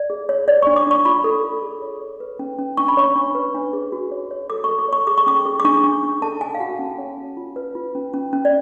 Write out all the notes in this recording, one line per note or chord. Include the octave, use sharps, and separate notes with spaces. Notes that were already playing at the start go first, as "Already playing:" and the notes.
Already playing: D5
G#4
C#5
C#5 D5
D4 C#6
D6
D4 C#6
F4 B5
A4
F4
G#4
C#5
C#5
B4
C#4
C#4
D4 C#6
B5
C#5 C#6
D4
B4
D4
G#4
F#4
C#5
C#5
A4 D6
A4 C#6
D6
C#5 C#6
G#4 D6
C#6
C#4 D6
G#4
D6
D4 C#6
D4
D4
A4 A5
D4 G#5
F5
F#4 F#5
C#4
C#5
C#4
F4
B4
F4
C#4
C#4
C#4
D5